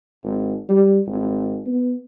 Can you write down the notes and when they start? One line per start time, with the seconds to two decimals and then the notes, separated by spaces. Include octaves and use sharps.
0.23 G#1
0.69 G3
1.07 G#1
1.66 B3